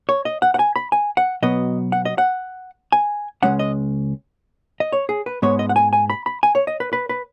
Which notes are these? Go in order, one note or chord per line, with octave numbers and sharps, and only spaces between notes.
C#5
D#5
F#5
F#5
G#5
B5
G#5
F#5
B2 F#3 B3 D#5
F#5
D#5
F#5
G#5
C#2 C#3 G#3 C#4 F#5
D#5
D#5
C#5
G#4
B4
G#2 G#3 B3 C#5
D#5
F#5
G#5
G#5
B5
B5
G#5
C#5
D#5
B4
B4
B4